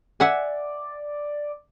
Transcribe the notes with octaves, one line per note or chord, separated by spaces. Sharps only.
D5 E5 F#5 G#5